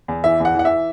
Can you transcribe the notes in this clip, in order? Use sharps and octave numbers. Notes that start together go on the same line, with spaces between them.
E2
E3 E5
E2 F#5
E3 F#5
E5